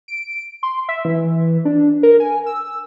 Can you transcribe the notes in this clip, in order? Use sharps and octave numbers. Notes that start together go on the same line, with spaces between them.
D7
C6
E5
E3
D4
A#4
G#5
E6